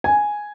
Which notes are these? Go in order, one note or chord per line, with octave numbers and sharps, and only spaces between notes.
G#5